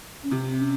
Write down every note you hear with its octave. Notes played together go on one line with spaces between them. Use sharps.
C#4
C3 C4
C#4